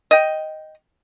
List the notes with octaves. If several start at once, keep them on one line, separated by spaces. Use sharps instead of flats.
D#5 G5